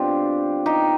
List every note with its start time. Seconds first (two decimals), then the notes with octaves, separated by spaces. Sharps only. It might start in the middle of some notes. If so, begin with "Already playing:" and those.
Already playing: B2 G3 B3 C4 D4 F4 G4
0.66 D#4 G4